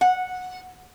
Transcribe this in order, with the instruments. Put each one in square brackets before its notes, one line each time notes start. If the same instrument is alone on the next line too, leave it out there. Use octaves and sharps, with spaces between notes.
[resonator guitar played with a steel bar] F#5